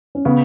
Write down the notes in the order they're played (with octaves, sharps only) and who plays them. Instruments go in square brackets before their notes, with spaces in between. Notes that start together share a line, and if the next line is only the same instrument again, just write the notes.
[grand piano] C#4
[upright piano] C#3 [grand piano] B3